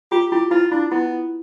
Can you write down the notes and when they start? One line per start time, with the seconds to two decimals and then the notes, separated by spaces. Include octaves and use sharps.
0.12 F4 G4
0.32 E4 G4
0.51 E4 F4
0.72 D4 E4
0.91 B3 E4